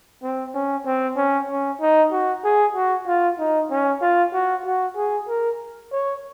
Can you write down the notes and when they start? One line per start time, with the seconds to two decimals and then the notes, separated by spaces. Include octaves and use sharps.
0.23 C4
0.54 C#4
0.86 C4
1.17 C#4
1.49 C#4
1.81 D#4
2.12 F#4
2.44 G#4
2.75 F#4
3.07 F4
3.39 D#4
3.71 C#4
4.02 F4
4.33 F#4
4.65 F#4
4.97 G#4
5.28 A#4
5.92 C#5